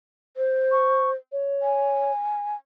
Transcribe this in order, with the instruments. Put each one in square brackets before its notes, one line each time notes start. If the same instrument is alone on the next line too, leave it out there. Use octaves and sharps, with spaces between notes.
[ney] C5
[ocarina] C#6
C#5
[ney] G#5